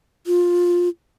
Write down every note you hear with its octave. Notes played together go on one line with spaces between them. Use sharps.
F4